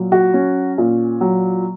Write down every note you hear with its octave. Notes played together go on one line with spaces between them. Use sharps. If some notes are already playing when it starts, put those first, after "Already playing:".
Already playing: A#2 F#3
F#4
C#4
A#2
F#3